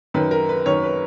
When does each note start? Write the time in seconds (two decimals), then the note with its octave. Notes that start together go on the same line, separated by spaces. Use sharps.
0.14 F#2 D#3 B4
0.31 A#4
0.49 B4
0.66 F#2 D#3 C#5
0.83 B4